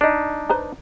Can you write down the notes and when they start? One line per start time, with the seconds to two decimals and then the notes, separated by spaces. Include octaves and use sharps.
0.01 D4 D#4 D5 D#5
0.49 B4 C5 A#5